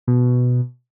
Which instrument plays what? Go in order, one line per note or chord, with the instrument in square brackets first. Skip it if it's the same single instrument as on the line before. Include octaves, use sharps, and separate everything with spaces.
[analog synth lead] B2